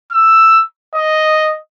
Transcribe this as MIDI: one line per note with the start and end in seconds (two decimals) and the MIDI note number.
0.12 0.63 88
0.95 1.56 75